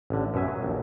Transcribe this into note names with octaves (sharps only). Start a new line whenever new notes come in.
A1 D3
F#2 B2 E5 G#5
F#3
A#1 D#2